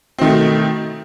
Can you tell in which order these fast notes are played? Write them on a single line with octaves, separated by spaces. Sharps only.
C4 D#3 A3 B2